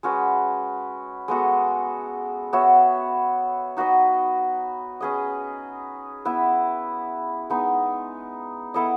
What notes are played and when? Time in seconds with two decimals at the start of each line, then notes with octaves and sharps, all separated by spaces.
0.03 G#3 C#4 F#4 B4
1.28 G#3 B3 F#4 A4
2.53 B3 F#4 C#5 E5
3.77 D#4 F#4 B4 D#5
5.01 C#4 G#4 B4 D#5
6.25 B3 E4 B4 E5
7.50 G#3 B3 D#4
8.74 B3 E4 A4 D#5